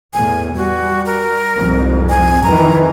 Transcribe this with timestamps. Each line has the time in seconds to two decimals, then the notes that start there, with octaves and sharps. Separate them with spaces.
0.14 E2 A2 G#5
0.56 G3 F#4
1.06 A#4
1.57 C2 F2 G#2
2.10 G#5
2.43 F2 D#3 E3 A#5